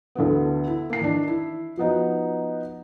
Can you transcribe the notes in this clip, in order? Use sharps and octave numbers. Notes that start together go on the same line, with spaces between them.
D2 D3 E3 B3
E4
A#3 C7
D#3 E3 D4
E4
F3 B3 D#4 F#4